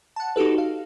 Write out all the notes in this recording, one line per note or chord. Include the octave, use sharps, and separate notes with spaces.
F#5 A5
D#4 F#4 G4 A4 B4
F5